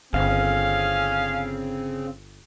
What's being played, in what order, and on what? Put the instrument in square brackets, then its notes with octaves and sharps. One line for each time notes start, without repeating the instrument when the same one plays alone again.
[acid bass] G1 [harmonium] C#3 C4 [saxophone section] C#4 G#4 F5